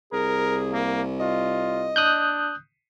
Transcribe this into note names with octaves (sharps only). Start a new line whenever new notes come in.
C2 G#4 A#4
A#3
F4 D#5
D4 D#6 F#6 G6